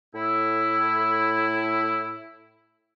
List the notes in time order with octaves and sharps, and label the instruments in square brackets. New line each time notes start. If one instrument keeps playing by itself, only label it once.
[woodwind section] A2 E4